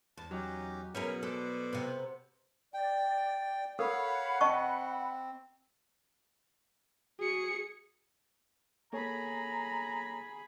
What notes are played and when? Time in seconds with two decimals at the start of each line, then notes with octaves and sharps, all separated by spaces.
0.17 E2 A5
0.31 F#3 C#4 D#4 G4
0.95 B2 C#4 E4 G#4 A#4 B5
1.23 A4 B4 C5 D5
1.73 C3 B3
2.74 D5 G5
3.79 A4 A#4 C#5 F5 F#5 B5
4.41 C4 D#5 A5 C#6
7.20 F#4 G#4 C#7
8.93 A#3 G#4 A4 C#5 A#5 B5